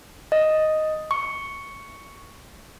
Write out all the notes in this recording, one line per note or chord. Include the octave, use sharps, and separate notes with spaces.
D#5
C#6